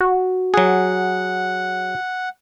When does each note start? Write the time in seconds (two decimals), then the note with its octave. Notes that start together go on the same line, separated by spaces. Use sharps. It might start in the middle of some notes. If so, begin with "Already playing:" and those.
0.01 F#4
0.54 F#3 G#4 F#5